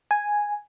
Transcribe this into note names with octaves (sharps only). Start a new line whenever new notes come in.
G#5